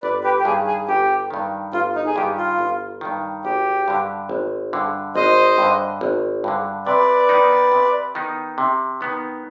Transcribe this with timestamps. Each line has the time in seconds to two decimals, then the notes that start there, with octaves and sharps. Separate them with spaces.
0.03 G1 B4 D5
0.24 G4 B4
0.39 G4
0.45 G2 D#3 G#4
0.67 G#4
0.88 G1 G4
1.30 G2 D#3
1.73 G1 F4
1.95 D#4
2.06 G#4
2.16 G2 D#3 G4
2.37 F4
2.59 G1
3.01 G2 D#3
3.44 G#1 G4
3.88 G2 D3
4.29 G#1
4.73 G2 D3
5.15 G#1 C5 D#5
5.58 G2 D3
6.01 G#1
6.44 G2 D3
6.86 C3 B4 D5
7.29 D#3 B3 D#4
7.72 C3
8.15 D#3 B3 D#4
8.58 C3
9.01 D#3 B3 D#4